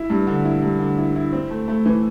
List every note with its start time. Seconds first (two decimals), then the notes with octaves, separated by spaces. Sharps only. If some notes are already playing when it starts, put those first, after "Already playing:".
Already playing: E4
0.10 G2
0.27 D3
0.45 E4
0.62 G2
0.79 D3
0.98 E4
1.16 E4
1.33 C4
1.51 A3
1.68 A3
1.86 E3